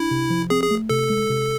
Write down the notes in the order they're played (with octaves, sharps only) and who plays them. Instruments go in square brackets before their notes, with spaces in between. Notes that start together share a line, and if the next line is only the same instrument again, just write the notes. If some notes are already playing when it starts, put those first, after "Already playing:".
Already playing: [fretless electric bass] D4 [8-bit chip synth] E4
[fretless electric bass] C3
F3
[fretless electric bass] C4 [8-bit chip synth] G#4
[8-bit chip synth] G#4
[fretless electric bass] A3
[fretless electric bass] C3 [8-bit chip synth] A4
[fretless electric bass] G#3
C3